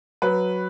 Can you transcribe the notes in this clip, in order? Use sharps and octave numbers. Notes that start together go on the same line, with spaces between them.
F#3 B4